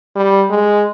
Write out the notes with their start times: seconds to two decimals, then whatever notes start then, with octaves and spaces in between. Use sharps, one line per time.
0.16 G3
0.50 G#3